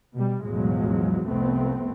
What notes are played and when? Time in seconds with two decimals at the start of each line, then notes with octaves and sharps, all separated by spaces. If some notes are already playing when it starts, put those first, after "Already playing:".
0.14 B2 G3
0.44 B1 E2 A2 F3 F#3 G#3
1.26 C2 F2 A3 B3 C4